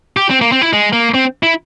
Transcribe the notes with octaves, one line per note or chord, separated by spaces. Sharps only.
G4
C4
A#3
C4
E4
G#3
A#3
C4
E4